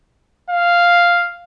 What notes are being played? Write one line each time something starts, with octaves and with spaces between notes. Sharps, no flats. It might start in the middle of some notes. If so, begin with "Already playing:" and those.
F5